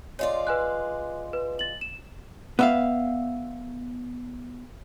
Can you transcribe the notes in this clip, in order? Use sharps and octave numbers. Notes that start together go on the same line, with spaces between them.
G#3 F4 C#5 D5
B4 G#5 F#6
B4
A6 F#7
E7
B3 E5 F5